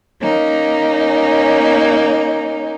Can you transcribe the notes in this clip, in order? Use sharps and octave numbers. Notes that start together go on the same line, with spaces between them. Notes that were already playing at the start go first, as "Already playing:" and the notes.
A#3 C#4 D#4